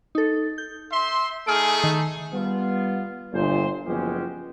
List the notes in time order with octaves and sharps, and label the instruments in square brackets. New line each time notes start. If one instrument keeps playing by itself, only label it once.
[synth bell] D#4 A4
G6
[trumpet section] E5 C6
[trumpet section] A3 D#4 G#4 [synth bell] F6 D7
[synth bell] D#3
[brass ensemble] G3 B3 F4
G1 A#2 C5
F#1 F3 G#3 B3 C#4 G4